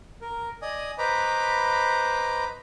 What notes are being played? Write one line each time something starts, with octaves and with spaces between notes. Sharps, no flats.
A#4
D5 D#5 G#5 D#6
B4 C5 D#5 A#5 B5 D6